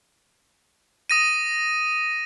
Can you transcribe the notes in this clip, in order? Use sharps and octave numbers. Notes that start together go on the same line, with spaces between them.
D#6 A#6 D#7